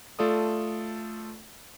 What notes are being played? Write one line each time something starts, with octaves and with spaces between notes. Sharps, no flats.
A3 F4 A4 D5 D#6